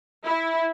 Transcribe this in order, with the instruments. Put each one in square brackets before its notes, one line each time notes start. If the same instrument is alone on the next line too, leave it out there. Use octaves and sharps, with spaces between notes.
[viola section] E4